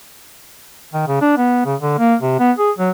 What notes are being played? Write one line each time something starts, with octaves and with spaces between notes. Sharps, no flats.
D#3
C#3
D4
B3
C#3
D3
A#3
C3
B3
G#4
F#3